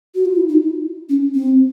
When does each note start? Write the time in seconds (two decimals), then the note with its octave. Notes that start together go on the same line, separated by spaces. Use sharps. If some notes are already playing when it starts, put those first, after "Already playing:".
0.15 F#4
0.25 F4
0.36 E4
0.49 D#4
1.09 C#4
1.34 C4